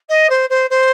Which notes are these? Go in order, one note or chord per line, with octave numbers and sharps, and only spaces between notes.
D#5
C5
C5
C5